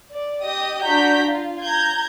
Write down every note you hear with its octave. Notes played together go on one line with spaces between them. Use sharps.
D5
G4 D#5 D#6
D4 F#4 A#5 G6 B6
F4
A#5 G6 G#6